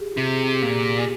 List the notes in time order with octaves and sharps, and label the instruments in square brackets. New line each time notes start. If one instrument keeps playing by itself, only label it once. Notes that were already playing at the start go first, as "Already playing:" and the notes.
Already playing: [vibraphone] G4 G#4
F4
[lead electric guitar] C3 [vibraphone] G4
[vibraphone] G#4
G4
[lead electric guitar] A#2